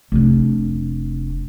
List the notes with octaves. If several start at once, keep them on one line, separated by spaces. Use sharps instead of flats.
F1 D4